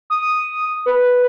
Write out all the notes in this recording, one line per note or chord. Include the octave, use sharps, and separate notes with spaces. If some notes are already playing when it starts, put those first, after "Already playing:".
D#6
B4